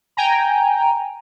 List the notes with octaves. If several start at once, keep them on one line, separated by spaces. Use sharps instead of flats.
G5 G#5 A#5